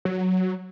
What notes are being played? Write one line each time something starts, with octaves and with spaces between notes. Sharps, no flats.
F#3